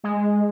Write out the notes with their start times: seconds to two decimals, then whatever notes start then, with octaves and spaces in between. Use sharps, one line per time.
0.04 G#3